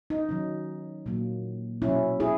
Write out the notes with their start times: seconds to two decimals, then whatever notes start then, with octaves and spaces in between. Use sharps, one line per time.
0.10 D#4
0.29 D#3 F#3 C#4
1.06 A#2 F#3 A#3
1.82 B2 F#3 C#4 E4
2.20 E4 G#4